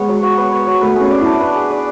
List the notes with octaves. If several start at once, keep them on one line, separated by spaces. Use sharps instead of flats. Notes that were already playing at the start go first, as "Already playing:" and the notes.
Already playing: G#3 B3 C#5
F#3
F#4
B3
C#5
F#3
A3 B4
C#4 G#4
D5
D4 E4
B4
G#4
D5